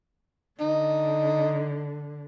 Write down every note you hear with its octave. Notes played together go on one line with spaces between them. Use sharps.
D3 D#4